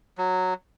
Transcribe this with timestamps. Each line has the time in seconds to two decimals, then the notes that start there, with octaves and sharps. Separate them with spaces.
0.18 F#3